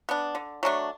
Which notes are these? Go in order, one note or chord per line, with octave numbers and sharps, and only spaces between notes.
B3 D4
D3
F#3 A3 D4